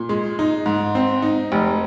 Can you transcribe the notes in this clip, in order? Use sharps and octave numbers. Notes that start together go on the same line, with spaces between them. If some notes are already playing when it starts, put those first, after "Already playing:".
Already playing: A#2
G#3
D#4
G#2
C4
D#4
F1